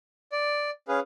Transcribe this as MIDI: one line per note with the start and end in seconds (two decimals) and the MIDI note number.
0.32 0.70 74
0.88 1.00 61
0.88 1.00 68
0.88 1.00 71
0.88 1.00 77